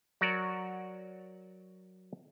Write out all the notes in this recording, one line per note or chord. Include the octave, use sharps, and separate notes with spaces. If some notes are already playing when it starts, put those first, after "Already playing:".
F#3 F#4 A#4 D5